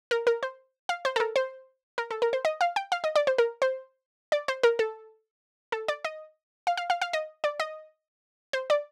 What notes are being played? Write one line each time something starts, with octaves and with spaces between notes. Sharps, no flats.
A#4
A#4
C5
F5
C5
A4
A#4
C5
A#4
A4
A#4
C5
D#5
F5
G5
F5
D#5
D5
C5
A#4
C5
D5
C5
A#4
A4
A4
D5
D#5
F5
F5
F5
F5
D#5
D5
D#5
C5
D5